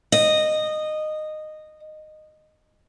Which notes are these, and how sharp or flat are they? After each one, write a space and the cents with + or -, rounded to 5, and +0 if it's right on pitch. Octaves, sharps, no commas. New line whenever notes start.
D#5 -15